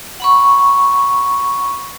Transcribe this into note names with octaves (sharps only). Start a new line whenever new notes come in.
F#5 B5 C#6